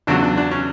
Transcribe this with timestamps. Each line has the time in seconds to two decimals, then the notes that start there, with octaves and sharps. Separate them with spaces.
0.07 E2 C#3 F#3 D4
0.22 D4
0.37 D4
0.51 C#4